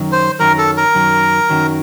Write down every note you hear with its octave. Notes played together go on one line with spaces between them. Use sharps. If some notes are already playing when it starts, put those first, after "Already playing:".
Already playing: F#2 D#3 F#3
C5
F#2 D#3 F#3 A#4
A4
A#4
F#2 D#3 F#3
F#2 D#3 F#3